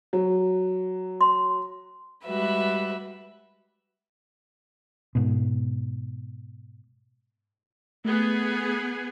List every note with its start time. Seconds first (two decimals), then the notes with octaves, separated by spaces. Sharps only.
0.13 F#3
1.21 C6
2.26 G3 G#3 F#4 B4 E5
5.15 G#2 B2
8.05 A3 B3 G#4